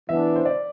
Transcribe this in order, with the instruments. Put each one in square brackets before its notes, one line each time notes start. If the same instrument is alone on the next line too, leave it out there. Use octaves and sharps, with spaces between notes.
[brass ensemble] E3 B3 D4 [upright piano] E5
[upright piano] C5
D5